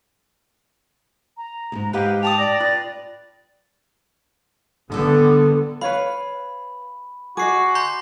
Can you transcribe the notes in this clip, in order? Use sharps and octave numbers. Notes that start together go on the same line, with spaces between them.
A#5
D#2 G#2
G#2 G4 B4 D#5 F5 F#5
G4 A5 D6 D#6 F7
D5 A#6
F4 B4 A6
D3 G3 A3 B3 A4
B4 C#5 F5 B5
F#4 G#4 D#5 D6 C7
A#5 C6 G6